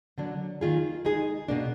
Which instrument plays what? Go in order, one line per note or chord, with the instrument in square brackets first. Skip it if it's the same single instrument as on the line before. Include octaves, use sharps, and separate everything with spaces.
[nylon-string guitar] D3 F#3 A#3 D4
D#3 A#3 F4 G#4
G#3 D#4 G#4
B2 A#3 D4